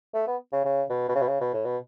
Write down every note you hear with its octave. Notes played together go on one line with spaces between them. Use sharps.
A3
B3
C#3
C#3
B2
B2
C#3
B2
C#3
B2
A2
B2